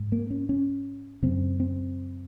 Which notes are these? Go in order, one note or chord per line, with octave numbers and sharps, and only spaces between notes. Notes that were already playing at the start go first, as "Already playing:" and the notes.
Already playing: G#2
A#3
C#4
C#4
F#2 C#3 C4
C4